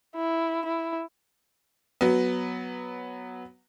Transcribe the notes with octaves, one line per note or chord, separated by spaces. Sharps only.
E4
E4
F#3 B3